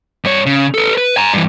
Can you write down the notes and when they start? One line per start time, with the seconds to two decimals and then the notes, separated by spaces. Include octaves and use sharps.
0.24 G2 C#5
0.46 C#3
0.74 A4 B4
0.98 B4
1.17 G#5 A#5
1.33 G2 E3